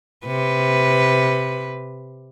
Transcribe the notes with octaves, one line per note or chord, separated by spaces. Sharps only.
C3 B4